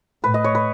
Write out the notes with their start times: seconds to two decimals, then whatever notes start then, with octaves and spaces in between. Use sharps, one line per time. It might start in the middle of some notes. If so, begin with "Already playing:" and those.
0.23 A2 B4
0.34 D#5
0.44 C#5
0.55 B4